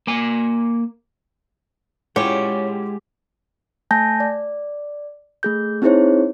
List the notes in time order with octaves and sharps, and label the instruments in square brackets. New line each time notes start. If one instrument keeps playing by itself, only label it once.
[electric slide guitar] A#3 G#5
[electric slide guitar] G#3 G#4 F#5 [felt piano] C#4 E4 F4 [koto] G4 [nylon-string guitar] C#5
[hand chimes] A3 G#5 A5 G6 A#6
D5
A3 G#4 G6
C4 D#4 E4 G#4 C5 C#5